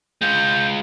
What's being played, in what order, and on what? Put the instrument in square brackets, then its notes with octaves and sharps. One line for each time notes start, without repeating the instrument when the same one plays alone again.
[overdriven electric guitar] G#3 F4 [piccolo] G6